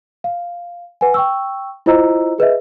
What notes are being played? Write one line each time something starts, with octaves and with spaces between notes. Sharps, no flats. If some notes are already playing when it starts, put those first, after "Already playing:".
F5
B4 F#5 G#5
G5 C#6 E6
E4 F4 C5 D#5 A#5 E6
G#4 B4 D#5 E5